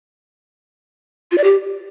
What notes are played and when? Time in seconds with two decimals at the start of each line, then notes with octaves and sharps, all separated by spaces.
1.31 F4
1.38 D5
1.44 G4